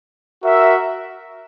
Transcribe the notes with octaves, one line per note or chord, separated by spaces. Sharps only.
F#4 A#4 E5